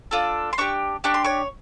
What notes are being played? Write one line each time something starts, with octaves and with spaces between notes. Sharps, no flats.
D4 F4 A4
C6
D4 G4 C#5 C#6
D4 G4 C#6
C6
C#5 C#6